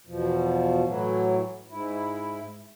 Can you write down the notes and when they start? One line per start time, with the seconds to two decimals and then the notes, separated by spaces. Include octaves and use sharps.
0.07 E2 B2 F3
0.83 A2 E3 F#3
1.69 G#2 E4